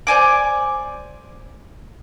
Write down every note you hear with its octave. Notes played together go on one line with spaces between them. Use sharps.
C5 D5 G#5 D6